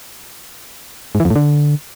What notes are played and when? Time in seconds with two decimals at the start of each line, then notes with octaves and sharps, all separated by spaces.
1.15 G#2
1.20 E3
1.25 F2
1.30 A2
1.36 D3